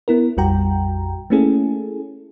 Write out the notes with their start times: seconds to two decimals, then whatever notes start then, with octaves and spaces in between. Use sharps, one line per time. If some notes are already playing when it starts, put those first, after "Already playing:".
0.08 B3 E4 A#4
0.37 A#1 F2 G3 F#4 G5 A#5
1.30 A3 A#3 C#4 E4 G#4 A4